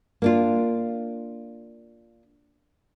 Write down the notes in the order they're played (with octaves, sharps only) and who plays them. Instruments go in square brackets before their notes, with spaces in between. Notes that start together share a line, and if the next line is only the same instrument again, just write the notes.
[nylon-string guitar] A#3 D4 F4